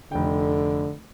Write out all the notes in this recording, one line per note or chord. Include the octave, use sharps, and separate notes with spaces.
F1 D3 G5